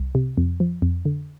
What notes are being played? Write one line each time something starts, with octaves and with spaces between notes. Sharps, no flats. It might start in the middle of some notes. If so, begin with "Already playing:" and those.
Already playing: C2
C3
F2
F3
F2
D3